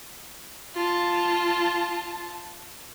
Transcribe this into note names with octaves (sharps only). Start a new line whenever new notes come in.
F4 A5